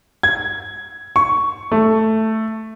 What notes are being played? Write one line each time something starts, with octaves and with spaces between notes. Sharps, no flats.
G#6
C#6
A3